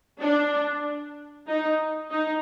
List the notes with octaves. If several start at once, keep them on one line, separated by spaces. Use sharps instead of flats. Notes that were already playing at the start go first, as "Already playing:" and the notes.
D4
D#4
D#4